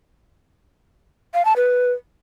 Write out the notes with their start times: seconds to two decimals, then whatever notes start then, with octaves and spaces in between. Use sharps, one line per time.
1.34 F5
1.45 A5
1.56 B4